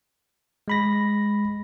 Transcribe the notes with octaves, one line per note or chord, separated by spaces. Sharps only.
G#3 B5 A#6